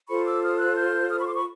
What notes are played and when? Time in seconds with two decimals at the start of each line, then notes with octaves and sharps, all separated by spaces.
0.09 F4 A4 C5 B5 C#6
0.25 D6 E6
0.43 D#6 F6
0.59 E6 F#6
0.76 F6 G6
1.10 D#6 F6
1.18 B5 C#6
1.26 C6 D6
1.35 B5 C#6